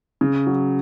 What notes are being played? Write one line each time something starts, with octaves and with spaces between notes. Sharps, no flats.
C#3
F#3